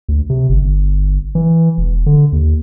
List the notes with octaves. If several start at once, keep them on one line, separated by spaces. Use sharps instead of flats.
D2
C3
G1
G1
E3
E1
D3
D#2